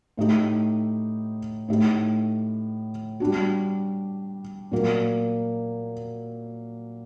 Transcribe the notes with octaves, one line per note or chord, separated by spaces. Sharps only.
A2 A3 D#4 G4
A2 A3 D#4 G4
G3 D4 F#4
A#2 F#3 A#3